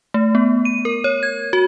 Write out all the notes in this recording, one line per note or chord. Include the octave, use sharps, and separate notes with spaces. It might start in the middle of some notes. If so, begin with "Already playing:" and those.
A3
B3
D#7
A#4
C#5
G#6
F#4